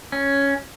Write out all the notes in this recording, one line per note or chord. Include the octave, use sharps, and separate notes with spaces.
C#4